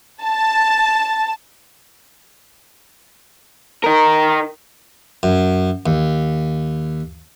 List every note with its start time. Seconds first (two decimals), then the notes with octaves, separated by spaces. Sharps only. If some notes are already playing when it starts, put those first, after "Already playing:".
0.23 A5
3.84 D#4 A#4
5.23 F#2
5.86 D#2